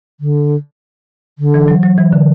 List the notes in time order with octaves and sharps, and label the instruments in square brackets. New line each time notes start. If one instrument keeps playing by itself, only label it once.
[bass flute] D3
D3
[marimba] E3
F#3
F#3
E3
D3